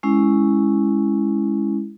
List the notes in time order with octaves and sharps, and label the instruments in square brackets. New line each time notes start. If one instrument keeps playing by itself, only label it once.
[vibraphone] G#3 C#4 E4